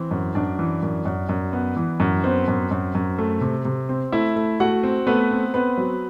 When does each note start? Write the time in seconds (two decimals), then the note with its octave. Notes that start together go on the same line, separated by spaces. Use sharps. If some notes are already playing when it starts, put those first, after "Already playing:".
Already playing: E3 C4
0.11 F#2
0.35 F#2 D4 D5
0.59 E3
0.83 F#2
1.05 F#2
1.29 F#2
1.53 B3
1.77 E3
2.00 F#2
2.23 B3 C4 C5
2.48 F#2
2.71 F#2
2.95 F#2
3.18 A3
3.41 C3
3.65 C3
3.89 C4
4.12 A3 E4 E5
4.36 A3
4.60 A3 F#4 F#5
4.83 C4
5.07 A3 B3 B4
5.31 C4
5.54 B3 C4 B4
5.78 F#3